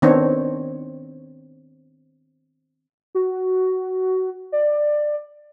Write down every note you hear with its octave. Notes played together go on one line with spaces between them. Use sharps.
D#3 B3 C4 D4 C#5
F#4
D5